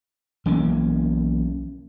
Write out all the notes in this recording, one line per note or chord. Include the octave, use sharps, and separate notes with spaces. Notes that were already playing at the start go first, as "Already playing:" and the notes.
B1 E3 A#3 C#4